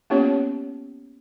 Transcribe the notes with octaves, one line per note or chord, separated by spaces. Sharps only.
A#3 B3 C#4 F4 G4 C#5